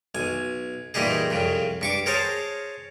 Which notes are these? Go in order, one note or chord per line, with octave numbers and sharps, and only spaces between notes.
B1 G#5
A#2 E3 G3 D#4 G#4
C2 F2 C#3
G2 C#6 D6
G#4 A#4 C5 C#5 A5